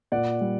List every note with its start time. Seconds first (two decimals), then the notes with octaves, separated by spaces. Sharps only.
0.12 A#2 D5 F#5
0.41 G3